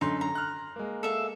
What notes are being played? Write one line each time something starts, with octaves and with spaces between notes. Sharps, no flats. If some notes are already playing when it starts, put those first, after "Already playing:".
F#2 D3 D#4 C6
A#5
F6 F#6
G#3 A#3
A4 E5 F5